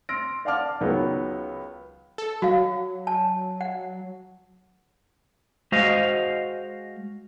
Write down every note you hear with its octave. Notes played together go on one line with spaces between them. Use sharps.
C6 E6 F6 A#6 D7
D5 F5 F#5 A5 D6 F6
C#2 D#3 F#3 B3
A4
F#3 F#4 F5
A5
F#5
G#3 F#4 C5 D#5 F5